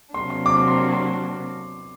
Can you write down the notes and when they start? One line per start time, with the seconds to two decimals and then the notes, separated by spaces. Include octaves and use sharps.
0.14 C3 F#3 A#3 D4 C6
0.30 C6
0.46 D6
0.57 D6
0.68 C6
0.78 C6
0.94 C6